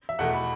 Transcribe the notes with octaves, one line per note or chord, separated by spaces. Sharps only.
E5
E2 B2 A3 F#5
B5